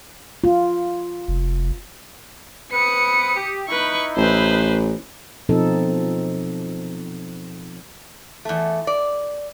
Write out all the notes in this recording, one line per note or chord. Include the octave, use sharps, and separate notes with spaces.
F4
F1
B3 C4 B4 D#6 C#7
G4
D#4 E4 B4 C#6
A1 B4 C5
B2 F3 C4 D#4 A4
E2 A3
D5